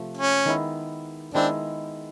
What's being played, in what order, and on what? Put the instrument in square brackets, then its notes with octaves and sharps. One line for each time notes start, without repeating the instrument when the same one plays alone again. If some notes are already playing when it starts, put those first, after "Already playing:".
Already playing: [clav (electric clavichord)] C3 F3 A3
[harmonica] C#4
[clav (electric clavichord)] D#3 G#3 B3 E4
[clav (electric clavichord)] D#3 G#3 B3 E4 [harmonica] C4 D4